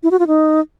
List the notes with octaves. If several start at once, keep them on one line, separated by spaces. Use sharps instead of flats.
E4
F#4
F4
D#4